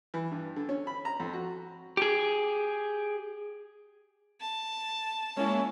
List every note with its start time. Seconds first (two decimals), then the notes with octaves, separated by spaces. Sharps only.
0.14 E3
0.31 G2
0.56 D3
0.69 C#4
0.87 B5
1.05 A#5
1.20 F2
1.33 F#4
1.97 G4 G#4
4.41 A5
5.37 G#3 A#3 C#4 E4 C#5